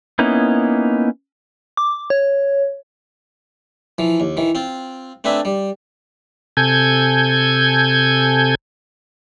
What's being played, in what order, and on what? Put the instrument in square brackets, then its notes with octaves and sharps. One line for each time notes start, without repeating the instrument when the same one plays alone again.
[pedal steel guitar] A#3 B3 C#4 D#4 E4
[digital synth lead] D6
C#5
[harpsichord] E3 F3
D#2
D#3 E3
C4 F4
A3 C4 D4 B4 E5 G#5
G3
[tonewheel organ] C3 A4 G#5 G6 G#6